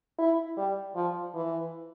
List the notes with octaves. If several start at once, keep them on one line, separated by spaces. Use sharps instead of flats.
E4
G3
F3
E3